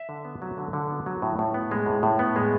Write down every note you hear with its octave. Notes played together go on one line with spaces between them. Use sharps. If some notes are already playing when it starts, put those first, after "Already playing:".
Already playing: E5
D3
B3
F#3
D3
D3
B3
F#3
A2
A2
B3
G#3
A2
A2
B3
G#3